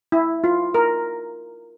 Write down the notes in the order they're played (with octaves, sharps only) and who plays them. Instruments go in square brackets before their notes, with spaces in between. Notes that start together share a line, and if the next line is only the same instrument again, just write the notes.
[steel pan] E4
F4
A#4